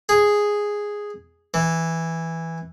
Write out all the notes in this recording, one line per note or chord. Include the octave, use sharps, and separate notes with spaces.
G#4
E3